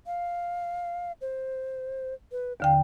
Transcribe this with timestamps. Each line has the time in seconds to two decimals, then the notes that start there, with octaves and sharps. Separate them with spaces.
0.06 F5
1.21 C5
2.32 B4
2.60 D#2 D3 F5 G5